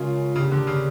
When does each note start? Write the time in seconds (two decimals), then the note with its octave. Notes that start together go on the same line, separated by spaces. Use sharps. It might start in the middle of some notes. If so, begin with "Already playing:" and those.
Already playing: C#3 G#3 C#4 F4 A#4
0.36 C#3 A#3 D4 G4
0.52 D3
0.67 C#3